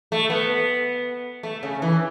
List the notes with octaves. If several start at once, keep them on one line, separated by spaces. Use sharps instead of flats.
A3
B3
A3
C#3
E3